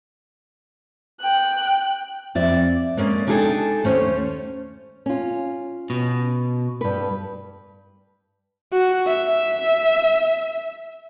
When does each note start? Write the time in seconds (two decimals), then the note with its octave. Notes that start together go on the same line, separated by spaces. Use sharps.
1.21 G5 F#6
2.35 F2 D5 E5
2.97 G#3 A#3 C#4 D5
3.27 G#3 D4 D#4 G#4 A4 G5
3.84 D#2 A3 C#4 C5 C#5
5.06 C#4 F4
5.90 B2
6.81 G2 B4
8.73 F#4
9.07 E5